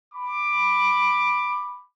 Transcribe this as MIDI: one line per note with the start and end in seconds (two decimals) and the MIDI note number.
0.14 1.84 83
0.14 1.84 86